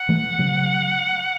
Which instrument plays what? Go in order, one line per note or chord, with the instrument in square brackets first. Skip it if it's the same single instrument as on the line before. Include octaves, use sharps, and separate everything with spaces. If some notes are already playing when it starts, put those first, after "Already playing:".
Already playing: [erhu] F#5
[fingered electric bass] E3 A3
C#3 F#3